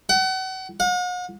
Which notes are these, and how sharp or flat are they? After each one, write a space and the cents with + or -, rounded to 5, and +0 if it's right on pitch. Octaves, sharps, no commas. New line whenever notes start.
F#5 +35
F#5 -45